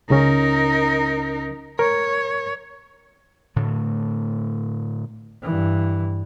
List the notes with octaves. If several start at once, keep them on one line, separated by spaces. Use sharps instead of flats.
C#2 C#3 C#4 D#4 A#4
A#4 C#5
A2 D3 A3
G2 E3